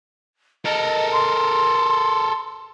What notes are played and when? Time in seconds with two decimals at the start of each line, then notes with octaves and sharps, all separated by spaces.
0.65 A4 A#4 D#5
1.12 C6